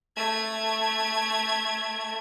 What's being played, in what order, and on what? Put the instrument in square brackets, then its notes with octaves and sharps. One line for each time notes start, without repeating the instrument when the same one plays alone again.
[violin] A3 G#6